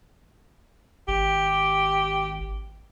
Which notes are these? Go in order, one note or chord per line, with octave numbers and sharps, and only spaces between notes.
G#1 G4